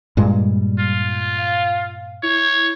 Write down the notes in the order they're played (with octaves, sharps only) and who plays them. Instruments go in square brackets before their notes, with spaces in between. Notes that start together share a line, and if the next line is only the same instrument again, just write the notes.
[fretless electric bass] G2 A#2 G#3 [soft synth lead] G3
[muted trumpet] F4
[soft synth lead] F5
[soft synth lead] E4 [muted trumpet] C#5